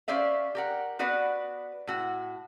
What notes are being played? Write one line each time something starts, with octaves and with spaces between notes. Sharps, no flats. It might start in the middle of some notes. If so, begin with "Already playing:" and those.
C#4 G4 C5 D5 E5 F5
G4 A#4 F#5
B3 F#4 B4 D5 F#5
A2 F#4